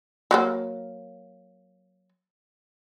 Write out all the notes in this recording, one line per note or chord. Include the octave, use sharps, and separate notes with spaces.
F#3 G#3 A#3